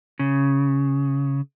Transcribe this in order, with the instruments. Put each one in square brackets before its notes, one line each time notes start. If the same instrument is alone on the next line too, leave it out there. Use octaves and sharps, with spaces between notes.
[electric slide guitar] C#3